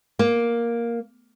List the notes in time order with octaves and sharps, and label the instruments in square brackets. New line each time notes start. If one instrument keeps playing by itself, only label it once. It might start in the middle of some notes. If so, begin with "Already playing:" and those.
[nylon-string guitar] A#3